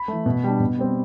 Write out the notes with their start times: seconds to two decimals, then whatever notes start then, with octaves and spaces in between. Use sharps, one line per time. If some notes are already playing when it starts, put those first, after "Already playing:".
Already playing: B5
0.08 E3 A3
0.26 B2
0.44 G3 D4
0.60 B2
0.79 G3 C4